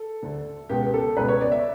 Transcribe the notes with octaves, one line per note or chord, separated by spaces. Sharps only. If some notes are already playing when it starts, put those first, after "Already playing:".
Already playing: A4
D2 D3
C#2 B2 G4
A4
C#2 B2 B4
C#5
D5
E5